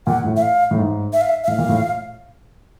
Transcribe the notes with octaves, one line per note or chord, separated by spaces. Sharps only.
A#2 F#5
A2
E5
F5
A2
G#2
E5
F5
E5
E5
A2 F5
A#2
A2